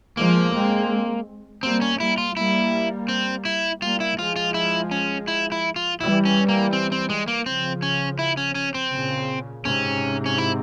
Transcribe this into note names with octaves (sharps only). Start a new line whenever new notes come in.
F3 G#3 A#3
G#3 C4
G3 A#3 C4
C#4
G3 A#3 E4
F4
G3 A#3 E4
C4
E4
G3 A#3 F4
E4
F3 G#3 F4
F4
E4
C#4
E4
E4
F4
E3 G3 E4
C#4
A#3
C4
C4
G#3
A#3
C#3 F3 C4
C#4
E4
C#4
C#4
C4
A#2 C#3
G#2 C3 C#4
C#4
E4